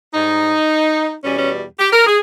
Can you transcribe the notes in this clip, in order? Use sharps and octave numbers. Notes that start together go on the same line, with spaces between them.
G#2 G3 D#4
E2 B2 G3 C#4
C#4
G4
A#4
G#4